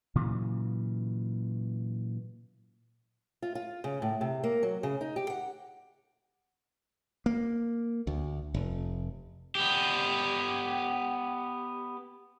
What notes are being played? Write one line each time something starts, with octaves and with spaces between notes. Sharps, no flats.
A#2 C#3 E3 F#3
F4
F4
C#3
A2
C3
A#3
F#3
C#3
D#4
G4
F#5
A#3
D2
F1
B3 G4